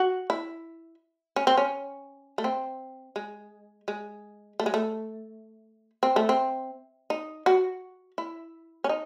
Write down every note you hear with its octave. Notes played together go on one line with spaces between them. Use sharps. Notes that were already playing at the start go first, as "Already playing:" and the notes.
Already playing: F#4
E4
C#4
C4
C#4
A3
C4
G#3
G#3
A3
G#3
A3
C4
A3
C4
D#4
F#4
E4
C#4
D#4